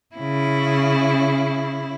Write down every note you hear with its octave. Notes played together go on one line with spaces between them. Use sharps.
C#3 E4